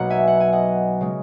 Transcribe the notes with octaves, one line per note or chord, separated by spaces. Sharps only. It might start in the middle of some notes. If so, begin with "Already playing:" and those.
Already playing: B1 B2 F#3 A#3 F#5
E5 G#5
F#5
G#5
D#5 F#5
C#3 G#3